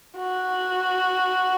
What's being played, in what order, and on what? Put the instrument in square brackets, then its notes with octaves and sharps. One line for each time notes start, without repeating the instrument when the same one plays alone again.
[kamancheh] F#4